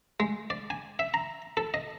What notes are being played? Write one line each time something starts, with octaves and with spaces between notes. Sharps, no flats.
G#3
D5
G#5
E5
A#5
A4
D#5